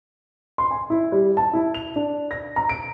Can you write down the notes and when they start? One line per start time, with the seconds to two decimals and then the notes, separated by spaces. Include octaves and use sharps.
0.58 C6
0.71 G#5
0.90 E4
1.12 G3
1.37 A5
1.53 E4
1.74 F7
1.96 D4
2.31 A#6
2.56 A#5
2.69 D7